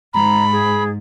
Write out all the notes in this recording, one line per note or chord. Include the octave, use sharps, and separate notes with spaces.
G#2 A#5 B5
G#4